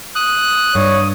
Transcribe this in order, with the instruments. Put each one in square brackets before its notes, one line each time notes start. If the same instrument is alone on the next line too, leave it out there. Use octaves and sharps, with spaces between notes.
[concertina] D#6 [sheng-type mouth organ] F#6
[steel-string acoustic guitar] G2 [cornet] C#5